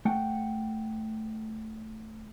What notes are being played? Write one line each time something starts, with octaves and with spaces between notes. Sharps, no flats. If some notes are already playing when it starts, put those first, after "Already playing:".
A3 F#5 G5